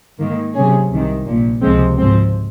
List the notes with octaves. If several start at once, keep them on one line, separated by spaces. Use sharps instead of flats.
G#2 D#3 A#3
C3 F#3 C#4 G#4
C2 C3 D#3
A#1 A#2 F3
C#2 C3 F3 G#3 C4
G#1 G#2 F3 C4